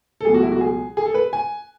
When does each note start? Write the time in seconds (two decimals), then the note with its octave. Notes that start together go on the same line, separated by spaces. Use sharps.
0.21 A4
0.25 C#2 B2 F#3 A3 G#4
0.34 F#4
0.43 E4
0.52 F#4
0.61 G#4
0.97 G#4
1.06 A4
1.14 B4
1.33 G#5